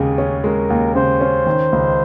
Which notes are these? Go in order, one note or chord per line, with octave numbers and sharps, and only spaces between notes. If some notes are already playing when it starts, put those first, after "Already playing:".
Already playing: D#2 C#3 G#3 G#4
C#4
G#3 A#4
D#2
C#3 C5
C#4
D#3
C#2